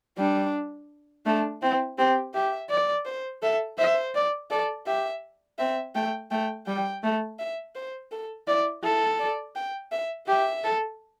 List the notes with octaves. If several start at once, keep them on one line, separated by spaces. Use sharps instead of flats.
G3 D4
A3 D4
C4 E4
C4 G4
G4 E5
D5
C5
A4 E5
C5 E5
D5
A4 D5
G4 E5
C4 E5
A3 G5
A3 G5
G3 G5
A3
E5
C5
A4
E4 D5
E4 A4
D5
G5
E5
G4 E5
A4